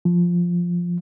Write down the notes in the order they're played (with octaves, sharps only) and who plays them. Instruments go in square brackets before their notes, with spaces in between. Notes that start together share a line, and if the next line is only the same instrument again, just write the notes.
[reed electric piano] F3